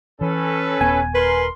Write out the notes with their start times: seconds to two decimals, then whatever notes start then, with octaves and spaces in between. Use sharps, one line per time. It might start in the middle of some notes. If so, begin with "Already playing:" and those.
0.21 E3 C#4 A4 B4
0.81 D#1 B3 G#5
1.15 A#4 B4 C6